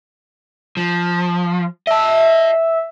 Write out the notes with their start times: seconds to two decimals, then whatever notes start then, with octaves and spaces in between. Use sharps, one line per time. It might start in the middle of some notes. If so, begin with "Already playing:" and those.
0.77 F3
1.87 D#5 E5 A5